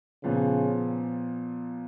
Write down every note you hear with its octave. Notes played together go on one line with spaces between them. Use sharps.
A#2 C#3 F3 B3